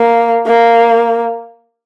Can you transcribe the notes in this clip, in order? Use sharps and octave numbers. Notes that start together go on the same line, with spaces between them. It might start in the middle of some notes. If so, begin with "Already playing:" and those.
Already playing: A#3
A#3